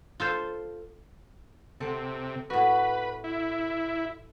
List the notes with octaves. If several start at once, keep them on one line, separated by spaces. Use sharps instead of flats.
F4 A4 C5
C3 C4 A4
A2 F#4 B4
E4